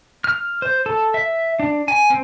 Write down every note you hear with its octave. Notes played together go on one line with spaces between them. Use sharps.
F6
C5
A4
E5
D4
G#5
C4